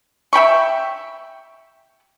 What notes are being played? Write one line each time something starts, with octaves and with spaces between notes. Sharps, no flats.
E5 G5 B5 C#6